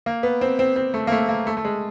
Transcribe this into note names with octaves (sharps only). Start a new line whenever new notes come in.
A#3
B3
C4
C4
C4
A3
A#3
A3
A#3
A3
A3
G#3